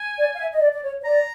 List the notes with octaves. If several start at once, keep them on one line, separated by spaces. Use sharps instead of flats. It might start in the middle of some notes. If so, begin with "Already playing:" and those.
Already playing: G#5
D5
F5
E5
D#5
D5
D5
C#5
C#5
D5 A#5